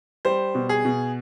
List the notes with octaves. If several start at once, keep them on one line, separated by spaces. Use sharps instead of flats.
G3 C5
B2
G#4
B2